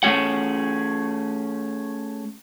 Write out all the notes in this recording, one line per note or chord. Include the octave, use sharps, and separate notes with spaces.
A3 C#4 G#4 F#5